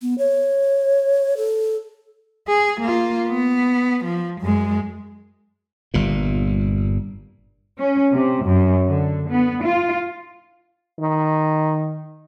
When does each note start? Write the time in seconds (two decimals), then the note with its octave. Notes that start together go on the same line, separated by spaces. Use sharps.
0.02 B3
0.18 C#5
1.37 A4
2.48 G#4
2.81 A#3 F4
3.29 B3
4.05 F3
4.41 F#2 G#3
5.94 G1 G2 A#2
7.79 C#4
8.13 C3
8.45 F#2
8.87 D3
9.29 B3
9.63 F4
11.00 D#3